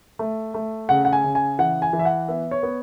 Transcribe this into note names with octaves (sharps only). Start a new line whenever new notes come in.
A3
A3
C#3 F#5
F#5
G#5
C#3
G#5
E3 F#5
G#5
E3
E5
F#5
B3 E5
C#5
B3